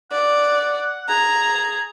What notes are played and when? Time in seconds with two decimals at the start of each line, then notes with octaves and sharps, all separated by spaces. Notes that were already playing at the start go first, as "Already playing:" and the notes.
0.12 D5 F#5
1.09 G#4 A#5